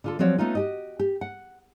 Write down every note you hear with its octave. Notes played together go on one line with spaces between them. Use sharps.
D3 F4 A4
F3 F#3 C4 F#4 C#5 D5
A3 B3 C#4 D#4 F4
F#4 G4 D#5
G4
F#5